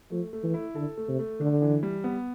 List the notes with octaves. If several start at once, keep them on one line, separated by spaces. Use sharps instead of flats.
F3 A3
A3
E3
E4
D3 A4
A3
C3
A3
D3 D4
E3
G3
B3